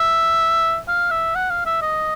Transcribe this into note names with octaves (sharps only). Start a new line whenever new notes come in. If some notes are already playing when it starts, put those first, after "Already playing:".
Already playing: E5
F5
E5
F#5
F5
E5
D#5